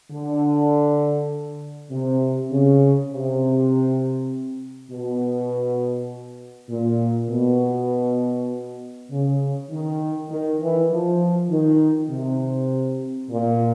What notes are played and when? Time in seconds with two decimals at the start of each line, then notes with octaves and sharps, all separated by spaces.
0.12 D3
1.91 C3
2.51 C#3
3.11 C3
4.91 B2
6.70 A#2
7.31 B2
9.11 C#3
9.71 D#3
10.30 D#3
10.61 E3
10.91 F3
11.50 D#3
12.11 C3
13.30 A#2